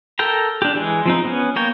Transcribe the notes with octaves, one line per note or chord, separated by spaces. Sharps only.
A4 A#4 G5 A#5
D4 G4
E3 G#3
F3 C4 D#4
B3 C#4
A#3 A#4 C#5 G5